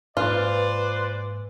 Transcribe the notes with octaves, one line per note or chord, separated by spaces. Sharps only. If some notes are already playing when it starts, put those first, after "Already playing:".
G#2 E3 A#3 F4 B4 C5 D5